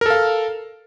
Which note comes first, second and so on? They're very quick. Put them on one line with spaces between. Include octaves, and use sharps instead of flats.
A#4 A4 F5